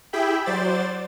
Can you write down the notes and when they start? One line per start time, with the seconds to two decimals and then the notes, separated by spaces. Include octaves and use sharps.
0.13 E4 G4 G#4 E5 G5 B5
0.46 F#3 C5 D5 A6